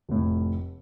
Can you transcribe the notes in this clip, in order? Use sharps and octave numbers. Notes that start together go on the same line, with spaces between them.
F1 A2